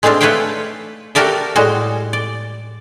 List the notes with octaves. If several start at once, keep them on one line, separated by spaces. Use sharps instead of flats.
G#3 A3 C4 D4 F4
A3 B4 C#5 E5 F5 G5
F#4 G4 A4 A#4 D5 E5
A2 G3 G#3 F#4
D5